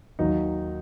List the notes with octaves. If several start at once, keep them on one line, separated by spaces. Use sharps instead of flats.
D#2 D#3 F#3 D#4